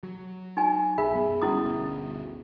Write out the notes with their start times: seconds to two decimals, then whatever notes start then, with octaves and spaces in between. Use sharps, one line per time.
0.03 F#3
0.57 D#4 G#5
0.98 B1 G#4 E5 B5
1.15 F#2 B3
1.42 G1 A#2 G3 C#4 E4 D#6
1.63 G1 D2 B2